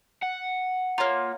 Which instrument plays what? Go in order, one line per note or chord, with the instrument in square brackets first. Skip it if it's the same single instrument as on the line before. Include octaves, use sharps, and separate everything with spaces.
[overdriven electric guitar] F#5
[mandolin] A#3 F4 [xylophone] C#5 A#5